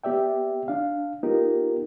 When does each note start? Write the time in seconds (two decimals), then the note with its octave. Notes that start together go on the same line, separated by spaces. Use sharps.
0.04 B3 G4 D5 E5 G5
0.68 D4 F5
1.23 B3 D#4 F4 G4 A#4